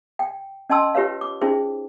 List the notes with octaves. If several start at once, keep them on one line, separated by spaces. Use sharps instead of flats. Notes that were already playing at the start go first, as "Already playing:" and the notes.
G5
C#4 D#5 G5 A5 C6 E6
F4 G4 B4 C#5 F5
D6
C#4 D#4 F4 G#4 C5